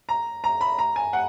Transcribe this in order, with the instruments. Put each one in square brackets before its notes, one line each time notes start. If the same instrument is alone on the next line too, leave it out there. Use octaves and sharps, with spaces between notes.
[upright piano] A#5
A#5
B5
A#5
G#5
F#5